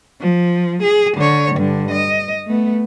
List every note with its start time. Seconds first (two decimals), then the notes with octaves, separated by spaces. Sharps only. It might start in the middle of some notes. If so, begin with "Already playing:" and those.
0.21 F3
0.83 G#4
1.17 D3 C#5
1.56 G2 D3
1.91 D#5
2.46 A3 B3